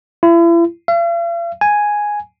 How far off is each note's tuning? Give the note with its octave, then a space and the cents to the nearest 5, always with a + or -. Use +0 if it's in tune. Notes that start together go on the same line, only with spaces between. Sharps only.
E4 +40
F5 -45
G#5 +0